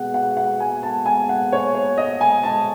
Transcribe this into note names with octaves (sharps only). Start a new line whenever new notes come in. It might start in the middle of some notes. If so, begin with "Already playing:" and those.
Already playing: B2 G#3 F#5
F#5
F#5
G#5
A5
G#5
F#5
C#5
C#5
D#5
G#5
A5